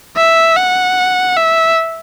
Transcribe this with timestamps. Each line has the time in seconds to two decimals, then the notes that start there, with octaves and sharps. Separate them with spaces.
0.17 E5
0.56 F#5
1.36 E5